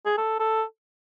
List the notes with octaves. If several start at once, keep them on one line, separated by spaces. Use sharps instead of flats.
G#4
A4
A4